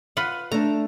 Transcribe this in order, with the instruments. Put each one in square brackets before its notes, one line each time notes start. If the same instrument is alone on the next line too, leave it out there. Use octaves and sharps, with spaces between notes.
[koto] F4 B4 F#5
[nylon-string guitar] A3 D4 [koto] A#5